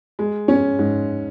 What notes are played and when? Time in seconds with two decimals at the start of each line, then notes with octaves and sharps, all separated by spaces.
0.19 G#3
0.48 C#4
0.79 G#2